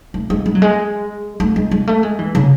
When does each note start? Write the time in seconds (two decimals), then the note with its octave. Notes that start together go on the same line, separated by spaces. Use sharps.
0.14 A3
0.30 G#3
0.46 G#3
0.55 F#3
0.62 G#3
1.40 A3
1.56 G#3
1.71 G#3
1.88 A3
2.03 G#3
2.19 E3
2.35 C#3